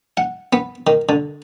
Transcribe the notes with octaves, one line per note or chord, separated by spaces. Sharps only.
F#5
B3
D#3
D3